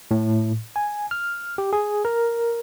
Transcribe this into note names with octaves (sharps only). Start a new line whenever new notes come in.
A2
G#5
F6
G4
G#4
A#4